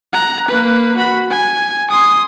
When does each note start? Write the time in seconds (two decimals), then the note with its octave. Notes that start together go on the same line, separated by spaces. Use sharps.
0.13 A#5 F#6
0.48 A#3 B4
0.96 F#4 B5
1.30 G#5
1.90 C6 D#6